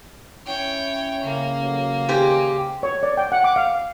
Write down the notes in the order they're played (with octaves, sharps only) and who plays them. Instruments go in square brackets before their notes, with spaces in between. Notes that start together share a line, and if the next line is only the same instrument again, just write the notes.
[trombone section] C#4 E4 [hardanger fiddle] C#5 G5
[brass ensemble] C#3 [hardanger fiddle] A#3
[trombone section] A1 F#3
[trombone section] D#3 G#4 [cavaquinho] G4 C5 G#5
[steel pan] C#5
D5
G5
F#5
D6
F5